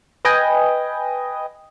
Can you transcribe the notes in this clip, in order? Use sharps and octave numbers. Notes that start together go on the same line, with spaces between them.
B4 D#5 G5 G#5